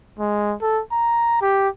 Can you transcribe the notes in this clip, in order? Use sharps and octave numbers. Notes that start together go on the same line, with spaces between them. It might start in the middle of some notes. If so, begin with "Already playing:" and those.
G#3
A4
A#5
G4